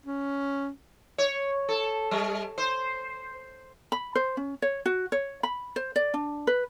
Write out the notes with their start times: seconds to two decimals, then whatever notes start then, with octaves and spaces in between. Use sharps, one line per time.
0.06 C#4
1.18 C#5
1.69 A4
2.11 G3
2.58 C5
3.92 B5
4.15 C5
4.37 C#4
4.62 C#5
4.86 F#4
5.12 C#5
5.43 B5
5.76 C5
5.96 D5
6.14 D4
6.47 B4